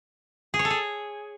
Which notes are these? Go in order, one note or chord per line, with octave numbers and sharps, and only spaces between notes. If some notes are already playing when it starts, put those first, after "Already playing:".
G#4
C#5
A4
G#4